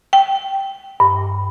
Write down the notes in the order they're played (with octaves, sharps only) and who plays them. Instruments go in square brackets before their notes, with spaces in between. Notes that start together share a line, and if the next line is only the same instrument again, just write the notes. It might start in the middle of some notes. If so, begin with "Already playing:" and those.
[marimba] G5
G2